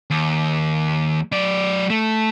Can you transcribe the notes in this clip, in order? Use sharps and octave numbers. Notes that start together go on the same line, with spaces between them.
D#2
F#3 D5
A3